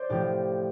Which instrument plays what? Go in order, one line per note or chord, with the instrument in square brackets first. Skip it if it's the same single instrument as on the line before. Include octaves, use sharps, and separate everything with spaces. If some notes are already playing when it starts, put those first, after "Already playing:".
Already playing: [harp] C5 D5
A2 F3 G4